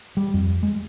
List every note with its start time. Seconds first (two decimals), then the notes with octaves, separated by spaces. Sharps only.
0.17 G3
0.34 F2
0.63 G#3